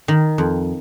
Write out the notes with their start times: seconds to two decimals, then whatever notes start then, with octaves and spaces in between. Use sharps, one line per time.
0.08 D#3
0.38 F2